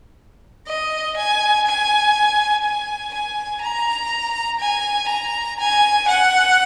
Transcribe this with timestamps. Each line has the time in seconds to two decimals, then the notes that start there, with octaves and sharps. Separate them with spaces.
0.68 D#5
1.16 G#5
1.67 G#5
2.65 G#5
3.14 G#5
3.62 A#5
4.60 G#5
5.09 A#5
5.59 G#5
6.08 F#5